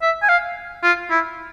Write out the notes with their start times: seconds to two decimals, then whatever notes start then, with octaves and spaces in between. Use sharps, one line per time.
0.02 E5
0.22 G#5
0.29 F5
0.83 F4
1.11 E4